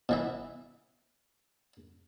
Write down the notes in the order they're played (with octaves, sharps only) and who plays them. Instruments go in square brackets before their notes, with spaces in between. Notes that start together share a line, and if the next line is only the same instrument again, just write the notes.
[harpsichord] B2 E3 E5